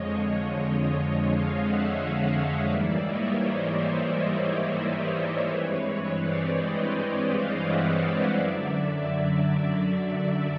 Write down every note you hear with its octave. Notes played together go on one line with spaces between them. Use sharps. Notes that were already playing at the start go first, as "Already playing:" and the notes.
Already playing: F2 D3 F3 G#3 C#5 D#5
D#5 F5
E5 F#5
D#5 F5
G#2 E3 G3 A#3 D5 E5
C#5 D#5
C5 D5
G2 E3 G#3 C4 B4 C#5
B4 C#5
C5 D5
C#5 D#5
D#5 F5
E5 F#5
D#5 F5
F#2 D3 F#3 D5 E5
D5 E5
D5 E5